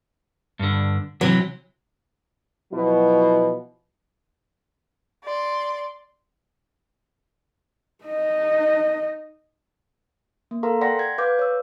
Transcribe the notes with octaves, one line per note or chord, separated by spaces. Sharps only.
G2 D3
C3 D#3 E3 F#3
B2 F3 F#3 E4
D5 C6
D#4 D#5
A#3
A4 A#4 F5 A#5 C6
D5 F#5 G5 C6 A#6 B6
G#6
B4 F5 D6 G6
C#5 E6